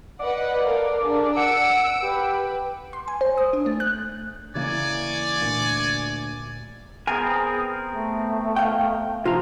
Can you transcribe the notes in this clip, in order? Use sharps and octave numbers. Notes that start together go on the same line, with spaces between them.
B4 D5 D#5 F#5
A4 A#4 F5
D4 G#4 A#4
F#5 E6 D7
G4 B4
C6
G#5
C5
D#6
D4
A3
F#6
C#3 E3 A#3 C#5 D5 G#5
D2 A#2
B3 C4 G#4 A#4 G#5
A3
F5 G5
C3 F3 F4 A#5